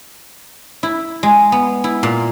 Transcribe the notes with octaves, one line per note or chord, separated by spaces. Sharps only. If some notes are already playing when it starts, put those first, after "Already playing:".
E4
G#3
B3
E4
A#2